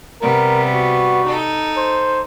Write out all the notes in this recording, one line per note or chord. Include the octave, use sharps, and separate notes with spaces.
C3 G3 B3 A#4
F#4
D#4 A4
C5